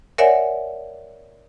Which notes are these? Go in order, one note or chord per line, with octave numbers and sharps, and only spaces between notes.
A#4 C#5 D5 E5 F#5 G#5